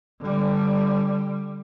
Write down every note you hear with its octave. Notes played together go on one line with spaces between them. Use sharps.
D3 G3